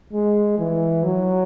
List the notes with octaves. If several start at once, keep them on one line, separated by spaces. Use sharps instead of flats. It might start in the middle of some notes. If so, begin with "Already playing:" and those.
G#3
E3
F#3